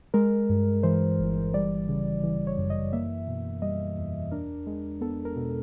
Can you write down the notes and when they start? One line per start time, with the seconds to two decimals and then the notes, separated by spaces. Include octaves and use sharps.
0.14 G#3 A#4
0.49 G2
0.83 E3 C5
1.19 G1
1.54 G3 D5
1.88 C#3
2.23 E3
2.47 C#5
2.58 F#2
2.70 D#5
2.93 A#3 E5
3.27 B2
3.62 G3 D#5
3.98 E2
4.31 D4 A#4
4.67 G#3
5.01 B3 A4
5.25 A#4
5.36 B2